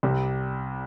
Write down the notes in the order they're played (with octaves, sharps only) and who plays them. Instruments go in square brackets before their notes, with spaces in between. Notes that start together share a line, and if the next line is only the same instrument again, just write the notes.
[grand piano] C2 C3 G3